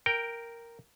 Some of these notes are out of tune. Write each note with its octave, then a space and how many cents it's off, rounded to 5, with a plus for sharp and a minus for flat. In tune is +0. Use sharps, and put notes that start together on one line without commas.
A#4 +0 G5 +0